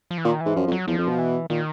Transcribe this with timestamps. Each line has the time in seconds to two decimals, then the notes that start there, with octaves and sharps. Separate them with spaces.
0.11 F3
0.18 E3
0.25 A#2 D#3
0.41 E3
0.46 G#2
0.56 F#2 F3
0.67 F2
0.72 F#3
0.87 E2 F3
0.98 F2
1.08 B2
1.18 E3
1.50 A#2 D#3